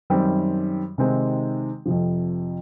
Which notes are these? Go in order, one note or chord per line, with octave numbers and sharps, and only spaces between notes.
F#2 D#3 G3 C4
C3 D#3 G#3 C4 D#4
F2 C3 F3